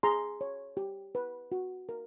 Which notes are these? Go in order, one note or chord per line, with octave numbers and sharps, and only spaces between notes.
G#4 A#5 C6
C#5
G4
B4
F#4
A#4